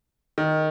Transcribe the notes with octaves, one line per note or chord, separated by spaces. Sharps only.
D#3